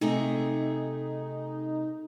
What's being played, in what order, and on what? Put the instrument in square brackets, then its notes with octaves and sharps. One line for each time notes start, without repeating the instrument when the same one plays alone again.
[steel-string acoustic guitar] C3 A3 G#4 [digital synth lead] D#4